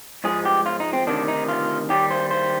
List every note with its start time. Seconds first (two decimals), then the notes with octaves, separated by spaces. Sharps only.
0.24 G#2 F3 G#3 G#4
0.45 G4
0.66 F4
0.80 D#4
0.93 C4
1.07 D2 C3 D#3 D4
1.28 D#4
1.49 F4
1.90 D#2 D#3 G3 G4
2.10 C5
2.31 C5